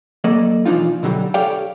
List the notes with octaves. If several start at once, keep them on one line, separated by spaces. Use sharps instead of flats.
F#3 A#3 A4 D5 D#5
B1 E3 F3 D4 D#4 F4
B2 D3 F#3 G3
G4 A4 C#5 D5 F5 G5